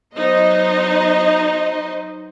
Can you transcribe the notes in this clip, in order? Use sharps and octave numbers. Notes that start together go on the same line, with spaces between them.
F#3 B3 D#4 C5 D#5